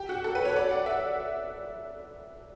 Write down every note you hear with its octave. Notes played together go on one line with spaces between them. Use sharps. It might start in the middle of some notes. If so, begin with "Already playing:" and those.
Already playing: G4
F#4
A4
B4
C#5
D5
F#5
E5